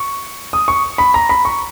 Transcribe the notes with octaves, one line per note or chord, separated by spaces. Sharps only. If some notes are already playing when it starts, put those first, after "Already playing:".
Already playing: C#6
D#6
C#6
B5
A#5
B5
C#6